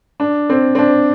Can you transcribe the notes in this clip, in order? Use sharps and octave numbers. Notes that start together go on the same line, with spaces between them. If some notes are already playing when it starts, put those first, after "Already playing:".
D4
C4
C4
D4